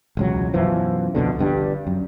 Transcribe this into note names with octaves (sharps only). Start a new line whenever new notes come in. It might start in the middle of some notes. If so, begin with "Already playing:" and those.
E1 C#2 F#3
F#2 B2 E3 F3
C2 F2 B2 D3
G1 G2 D3 G3
F#2